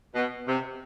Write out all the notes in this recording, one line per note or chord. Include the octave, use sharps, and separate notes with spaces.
B2
C3